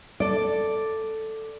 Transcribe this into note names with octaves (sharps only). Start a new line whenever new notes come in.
A4 D5